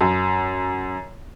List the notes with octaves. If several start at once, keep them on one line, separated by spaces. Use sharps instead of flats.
F#2